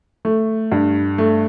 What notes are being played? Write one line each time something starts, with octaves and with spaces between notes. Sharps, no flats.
A3
G2
A3